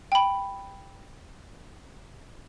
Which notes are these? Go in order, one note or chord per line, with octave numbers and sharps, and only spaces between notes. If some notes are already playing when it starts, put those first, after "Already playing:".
G5 B5